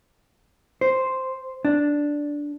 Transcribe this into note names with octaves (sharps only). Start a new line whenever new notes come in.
C5
D4